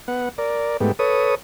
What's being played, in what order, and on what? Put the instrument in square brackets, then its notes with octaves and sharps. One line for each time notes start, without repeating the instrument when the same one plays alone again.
[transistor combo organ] B3 F#5
A#4 D5
G#2 A3 B3 G4
A4 B4 C#5 D#6